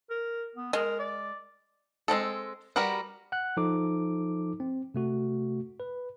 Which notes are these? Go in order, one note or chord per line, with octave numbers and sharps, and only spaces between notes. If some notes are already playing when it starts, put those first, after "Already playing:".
A#4
B3
G#3 A#4
D5
G#3 A#3 C4 A4
G3 F#4 A#4 B4 F#5
F#5 F#6
F3 D#4 A4 D6
C4
C3 A3 F#4
B4